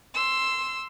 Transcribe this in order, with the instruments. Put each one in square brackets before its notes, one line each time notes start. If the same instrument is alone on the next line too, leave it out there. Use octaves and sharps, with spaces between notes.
[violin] C6 E6